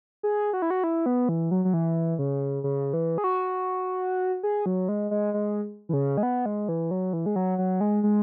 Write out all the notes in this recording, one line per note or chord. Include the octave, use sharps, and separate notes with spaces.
G#4
F#4
E4
F#4
E4
B3
E3
F#3
F#3
E3
C#3
C#3
E3
G#4
F#4
G#4
F#3
G#3
G#3
G#3
E3
C#3
G#3
B3
G#3
E3
F#3
E3
G#3
F#3
F#3
G#3
G#3